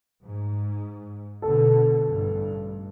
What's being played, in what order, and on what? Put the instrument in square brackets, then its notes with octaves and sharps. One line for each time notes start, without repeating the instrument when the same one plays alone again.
[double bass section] G#2
[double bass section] B2 D3 [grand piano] A4
[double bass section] A1 G2